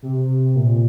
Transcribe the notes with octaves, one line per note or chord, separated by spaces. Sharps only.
C3
A#2